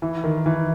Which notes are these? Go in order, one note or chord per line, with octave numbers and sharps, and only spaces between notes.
E3
D#3
E3